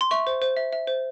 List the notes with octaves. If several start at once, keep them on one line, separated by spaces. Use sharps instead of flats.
C6
E5 C#6
C5
C5
E5
E5
C5